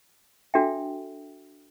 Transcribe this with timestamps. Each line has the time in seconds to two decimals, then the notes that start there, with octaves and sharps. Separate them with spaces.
0.54 D4 F#4 A4 E5 G5